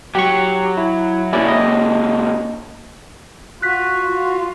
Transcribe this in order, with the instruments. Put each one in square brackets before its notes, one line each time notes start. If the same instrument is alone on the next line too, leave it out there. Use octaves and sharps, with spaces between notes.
[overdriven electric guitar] F#3 [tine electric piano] G4 C#6
[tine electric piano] E4
[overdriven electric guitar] A#2 C#3 [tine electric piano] C#4 E4 D5
[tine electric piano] D#5
[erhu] F4 [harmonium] F#4 [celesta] F#6 B6
[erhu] F4